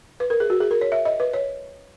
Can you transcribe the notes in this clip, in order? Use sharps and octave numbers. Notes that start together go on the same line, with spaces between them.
B4
A#4
G#4
F#4
G#4
A#4
C#5
E5
D#5
B4
C#5